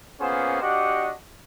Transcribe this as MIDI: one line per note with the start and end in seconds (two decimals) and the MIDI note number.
0.20 0.59 58
0.20 0.59 59
0.20 0.59 61
0.20 0.59 65
0.20 0.59 68
0.20 0.59 72
0.61 1.11 62
0.61 1.11 66
0.61 1.11 67
0.61 1.11 75
0.61 1.11 78